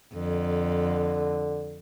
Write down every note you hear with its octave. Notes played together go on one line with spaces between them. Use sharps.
F2 D3